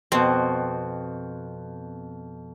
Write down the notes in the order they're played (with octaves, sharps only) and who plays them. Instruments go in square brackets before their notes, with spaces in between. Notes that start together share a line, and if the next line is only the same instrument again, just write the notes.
[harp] F2 B2 [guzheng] C4